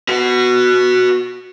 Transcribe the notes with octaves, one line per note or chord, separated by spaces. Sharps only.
F#4 B4